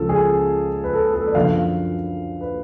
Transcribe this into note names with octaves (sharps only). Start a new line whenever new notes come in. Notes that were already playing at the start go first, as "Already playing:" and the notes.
Already playing: C#2 C#3 F3 A4
G#4
B4
A4
A4
D5
F#2 D3 F3 F5
B4